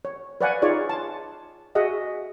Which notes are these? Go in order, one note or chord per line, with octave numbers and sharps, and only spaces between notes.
C#5
B4 C#5 D5 F5 F#5 G#5
D#4 F4 G#4 C#5 D5
A5 C6
F#4 G#4 D#5 E5 F#5